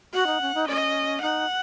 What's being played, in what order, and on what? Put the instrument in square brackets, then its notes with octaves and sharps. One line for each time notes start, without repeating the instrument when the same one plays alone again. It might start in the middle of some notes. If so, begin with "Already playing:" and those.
[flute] F#4 [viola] F#5
[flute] D#4
C#4
D#4
[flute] C#4 [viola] D#5
[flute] D#4 [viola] F#5